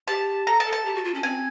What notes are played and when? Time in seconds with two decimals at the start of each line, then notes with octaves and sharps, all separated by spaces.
0.08 G4 A5
0.47 A4 A#5
0.60 A5
0.66 A4
0.73 A5
0.85 G4
0.95 F#4
1.04 F4
1.14 C#4
1.23 C4 G#5